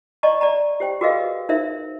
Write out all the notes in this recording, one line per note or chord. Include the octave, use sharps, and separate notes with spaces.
D5 D#5 A5 A#5 C#6
D5 A5 A#5
G4 C5 G5
F#4 G#4 A#4 B4 D#5 F5
D#4 A#4 C5 E5